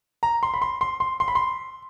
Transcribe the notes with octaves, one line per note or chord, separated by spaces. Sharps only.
A#5
C6
B5
C6
C6
C6
C6
B5
C6